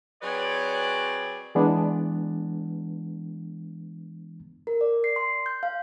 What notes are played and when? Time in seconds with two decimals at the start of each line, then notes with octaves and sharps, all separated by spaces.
0.22 F#3 C4 G#4 B4 C#5 D5
1.55 E3 G#3 B3 D4
4.67 A#4
4.81 D5
5.04 C7
5.16 C6
5.46 G6
5.63 F5